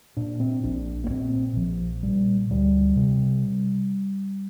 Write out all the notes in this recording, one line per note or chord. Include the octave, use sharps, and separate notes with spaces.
A#2 D4
C4
A#1 D4
A#3
A#2 C4
A#1 F3
A#2 G3
D2 G3
C3